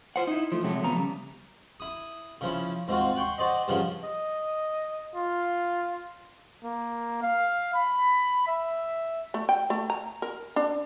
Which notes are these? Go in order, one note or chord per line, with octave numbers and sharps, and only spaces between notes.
F4 C5 F#5
D#4 E4
F3 A3
C3 F#3 G#3 A3
F3 A3 B3 A#5
C#3 G3
E4 D#6
C#3 F3 E4
G#2 C4 F4 F#4
F#5 G5 C6 C#6
F#4 C5 D5 D#5
G2 C#3 F3 F#5 C6
D#5
F4
A#3
F5
B5
E5
A3
G5
A3
A#5
A#4
D4